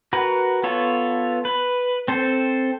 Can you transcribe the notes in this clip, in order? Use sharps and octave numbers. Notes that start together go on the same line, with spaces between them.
F#4 A#4 B4
B3 F4 A4 C#5
B4
C4 A4 C5